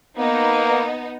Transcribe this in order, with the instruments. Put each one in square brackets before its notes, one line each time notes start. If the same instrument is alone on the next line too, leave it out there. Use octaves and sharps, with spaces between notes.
[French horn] A#3 [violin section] B3 D#4